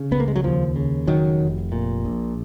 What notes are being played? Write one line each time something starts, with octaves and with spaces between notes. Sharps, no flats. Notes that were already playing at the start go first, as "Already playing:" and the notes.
Already playing: C#3
C#2 B3
A#3
G#3
F#3
D#2 F3
C#3
F1 D#3 F#3
F1
A#2
A#1